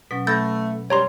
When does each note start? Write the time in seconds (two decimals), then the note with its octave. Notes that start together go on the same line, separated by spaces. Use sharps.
0.11 B2 F#3 C#4 B6
0.27 A3 B5 E6 G6 A6 A#6
0.90 F#2 B2 G3 C#5 A#5 C6